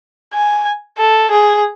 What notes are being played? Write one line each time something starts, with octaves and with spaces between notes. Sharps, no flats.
G#5
A4
G#4